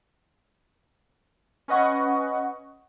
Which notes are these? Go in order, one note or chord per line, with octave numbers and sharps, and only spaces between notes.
C#4 B4 D#5 F#5 C#6